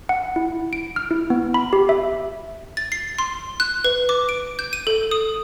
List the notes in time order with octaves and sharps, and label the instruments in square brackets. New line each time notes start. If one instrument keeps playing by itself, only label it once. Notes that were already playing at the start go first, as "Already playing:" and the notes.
[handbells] F#5
E4
D7
F6
E4
B3
B5
G4
E5
[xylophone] A6
C7
C6
F#6
B4
D6
D7
G6
D#7
A4
D#6